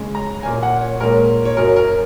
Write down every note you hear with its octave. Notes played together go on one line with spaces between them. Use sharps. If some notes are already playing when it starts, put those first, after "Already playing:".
Already playing: C#3 G#3 C#4
A#5
A#2 A#3 C#4 G#5
F#5
C#5
A#2 G#3 C#4 A#4
C#5
F#2 F#3 C#4 A#4
A#4